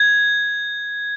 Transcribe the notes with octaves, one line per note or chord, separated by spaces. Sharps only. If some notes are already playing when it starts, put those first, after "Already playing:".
Already playing: G#6